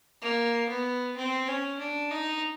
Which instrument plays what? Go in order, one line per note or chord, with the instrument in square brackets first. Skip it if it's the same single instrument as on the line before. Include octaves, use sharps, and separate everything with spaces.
[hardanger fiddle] A#3
B3
C4
C#4
D4
D#4